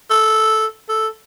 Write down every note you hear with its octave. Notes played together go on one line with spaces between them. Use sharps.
A4
A4